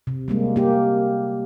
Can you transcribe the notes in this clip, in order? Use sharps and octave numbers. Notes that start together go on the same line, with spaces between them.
C3
G3 G#3 A#3
A#3 G4